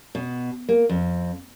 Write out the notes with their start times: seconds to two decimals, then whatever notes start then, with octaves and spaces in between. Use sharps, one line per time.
0.15 B2
0.69 A#3
0.89 F2